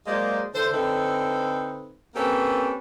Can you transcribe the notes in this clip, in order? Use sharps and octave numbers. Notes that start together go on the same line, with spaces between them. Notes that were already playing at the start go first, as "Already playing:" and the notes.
F#3 G#3 A#3 C5 D5 D#5
D3 E3 A4 C5
D3 C4 D#4 A4 B4 C5
A#3 C4 C#4 G4 A4 B4